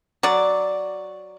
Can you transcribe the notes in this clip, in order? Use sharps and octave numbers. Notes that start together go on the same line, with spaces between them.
F#3 D5